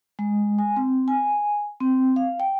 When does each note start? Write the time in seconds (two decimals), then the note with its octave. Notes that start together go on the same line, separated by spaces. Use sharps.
0.19 G#3
0.58 G#5
0.76 C4
1.08 G#5
1.80 C4
2.16 F5
2.40 G5